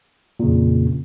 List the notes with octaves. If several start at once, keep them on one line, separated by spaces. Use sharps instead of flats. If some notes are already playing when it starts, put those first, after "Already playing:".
F2 A#2 C#3